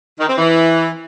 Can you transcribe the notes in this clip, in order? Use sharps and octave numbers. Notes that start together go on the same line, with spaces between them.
D#3
C4
E3